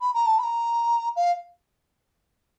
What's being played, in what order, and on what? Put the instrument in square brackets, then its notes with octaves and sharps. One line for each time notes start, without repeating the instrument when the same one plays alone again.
[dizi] B5
A#5
A5
B5
A#5
F5